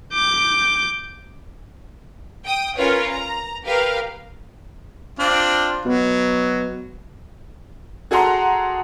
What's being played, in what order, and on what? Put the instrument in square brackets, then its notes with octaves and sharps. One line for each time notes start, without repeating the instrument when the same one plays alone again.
[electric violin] D6 G6
[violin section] G5 D#6
C#4 F4 A#4 B4 C#5
A#5
G4 A#4 B4 F5
[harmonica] C4 D4 F4
[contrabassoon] B2 [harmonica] F#3
[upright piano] F#4 G#4 A4 F#5 A#5 C6